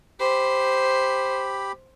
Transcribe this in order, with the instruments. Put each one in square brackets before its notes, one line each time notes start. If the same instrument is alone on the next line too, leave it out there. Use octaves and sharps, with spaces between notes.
[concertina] G4 B5 [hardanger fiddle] C5